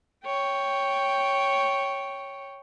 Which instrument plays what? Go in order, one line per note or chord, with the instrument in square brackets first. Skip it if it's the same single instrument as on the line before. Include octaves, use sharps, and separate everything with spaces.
[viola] C#5 G5